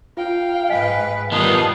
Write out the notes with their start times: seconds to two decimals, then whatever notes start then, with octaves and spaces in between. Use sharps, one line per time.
0.17 F4 F5 G5
0.69 G#2 B4 D#5 G#5 B6
1.32 D#3 G3 B3 D#4 F4 A5 D#6